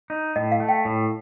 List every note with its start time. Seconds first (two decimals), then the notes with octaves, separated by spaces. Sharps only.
0.10 D#4
0.36 A2 D#5
0.52 F5
0.60 A3
0.69 G5
0.85 A2